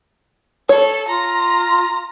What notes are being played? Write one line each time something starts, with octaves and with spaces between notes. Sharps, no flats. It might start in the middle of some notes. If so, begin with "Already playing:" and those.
A4 C#5
F4 A#5